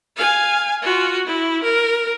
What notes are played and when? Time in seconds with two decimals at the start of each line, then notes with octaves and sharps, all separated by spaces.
0.16 F5 G#5
0.82 F4 F#4
1.26 E4
1.63 A#4